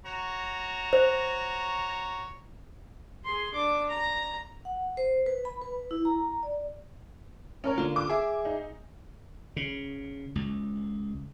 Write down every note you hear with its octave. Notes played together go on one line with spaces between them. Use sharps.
F#4 C#5 A#5
C5
G#4 C6
D4 D6
A#5
F#5
C5
B4
B5
B4
E4
A#5
D5
C#4 A#4 C#5
D3 A#3 F4
D6
G#4 E5
D#4
C#3
C#2